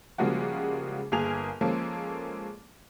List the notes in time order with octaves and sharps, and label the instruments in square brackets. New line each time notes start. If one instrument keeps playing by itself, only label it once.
[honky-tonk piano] C#3 F3 G3 G#3 A#3 F#4
G1 A#3 G#4 A#4 G#5 F7
F3 G#3 A#3 C#4 A4